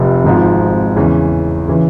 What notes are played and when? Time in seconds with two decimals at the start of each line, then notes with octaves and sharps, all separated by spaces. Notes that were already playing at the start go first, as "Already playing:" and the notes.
Already playing: F1 F2 C3 F3
0.24 G#1 G#2 F3
0.96 E2 C#3 E3
1.68 C#3 E3